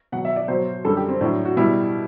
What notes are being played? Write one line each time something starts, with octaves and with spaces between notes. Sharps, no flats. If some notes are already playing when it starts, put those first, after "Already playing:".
B2 F#3 F#5
E5
D5
B2 F#3 C5
F#2 D3 G3 A4
G4
C4
A2 F#3 D4
F#4
B2 G3 E4